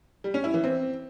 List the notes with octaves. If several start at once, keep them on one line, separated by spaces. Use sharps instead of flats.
G3
C#4
E4
E3
C4